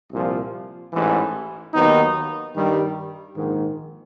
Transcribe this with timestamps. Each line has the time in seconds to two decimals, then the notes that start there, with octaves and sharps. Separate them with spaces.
0.11 C2 A#2 F3
0.93 A1 G#2 E3
1.74 D#2 D#3 F#3 B3 D#4
2.55 G2 D#3 G3
3.37 A#1 G#2 D#3